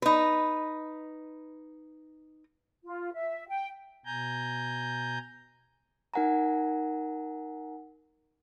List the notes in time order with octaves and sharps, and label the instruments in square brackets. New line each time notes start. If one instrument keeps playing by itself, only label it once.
[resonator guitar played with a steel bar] D#4 B4
[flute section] F4
E5
G5
[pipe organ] B2 G#5 A#5 G6
[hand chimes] D#4 A#4 F#5 G#5 A#5